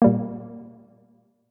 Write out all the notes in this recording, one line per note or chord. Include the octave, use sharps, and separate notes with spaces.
A#2 G3 A#3